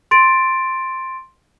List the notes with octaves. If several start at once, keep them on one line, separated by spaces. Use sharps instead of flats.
C6 A6 D7